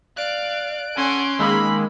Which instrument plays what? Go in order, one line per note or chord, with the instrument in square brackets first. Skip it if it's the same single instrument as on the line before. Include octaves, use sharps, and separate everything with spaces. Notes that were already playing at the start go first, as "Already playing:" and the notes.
[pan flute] D5 [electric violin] F5 [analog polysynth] F#6 D7
[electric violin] C#4 C6 [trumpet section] A4 F#5 G#5
[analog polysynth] D#3 G#3 A#3 [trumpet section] F5 B5 [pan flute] E6